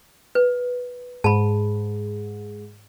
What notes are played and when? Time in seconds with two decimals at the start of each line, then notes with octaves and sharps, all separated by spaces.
0.35 B4
1.24 G#2 A5 B5